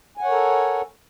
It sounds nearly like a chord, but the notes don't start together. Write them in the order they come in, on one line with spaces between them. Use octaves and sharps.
G#5 F#5 C#5 A#4 A4